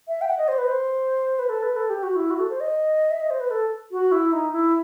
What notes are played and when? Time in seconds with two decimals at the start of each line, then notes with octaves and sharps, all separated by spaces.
0.08 E5
0.21 G5
0.28 F#5
0.38 D#5
0.48 C5
0.58 B4
0.68 C5
1.39 B4
1.49 A4
1.63 B4
1.76 A4
1.90 G4
2.03 F#4
2.16 E4
2.30 F#4
2.40 A4
2.50 C5
2.60 D#5
3.11 E5
3.20 D#5
3.30 C5
3.40 B4
3.51 A4
3.92 F#4
4.12 E4
4.33 D#4
4.52 E4